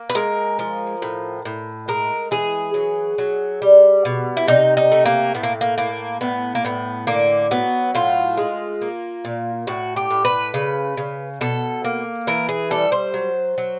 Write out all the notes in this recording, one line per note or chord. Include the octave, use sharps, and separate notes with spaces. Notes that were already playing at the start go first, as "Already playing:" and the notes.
Already playing: A#3
B4
G#3 A#4
F3
A2
A2
G#3 A#4
E3 G#4
F#3
F#3
G3
B2
E4
C3 D#4
D#4
A3
A#3
A2 B3
A#3
A#3
A2 A#3
A2 B3
A#3
A2 B3
D3 A#3
F#3 B3
A2 F4
G#3
A#3
A#2
A2 F#4
G4
A2
B4
C#3
C#3
B2 A4
A#3
E3 A#4
G#4
G3 A4
C5
F#3
F#3